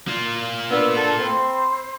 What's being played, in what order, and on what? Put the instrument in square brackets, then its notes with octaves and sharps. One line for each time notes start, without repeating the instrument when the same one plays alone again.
[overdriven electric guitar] A#3 F4
[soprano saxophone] B3 [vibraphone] D4 A#4 D5 [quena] E6
[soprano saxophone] A4 [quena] A5
[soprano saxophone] C4 [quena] C5 [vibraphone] B5 C6 E6